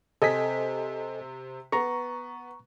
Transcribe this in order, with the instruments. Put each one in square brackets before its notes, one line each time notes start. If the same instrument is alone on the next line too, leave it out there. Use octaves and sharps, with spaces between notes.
[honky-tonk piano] C3 C4 B6 [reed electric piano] A4 D#5 G#5
[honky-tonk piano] B3 [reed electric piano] A#5 C#6